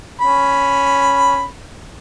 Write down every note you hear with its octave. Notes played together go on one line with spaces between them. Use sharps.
C#4 B5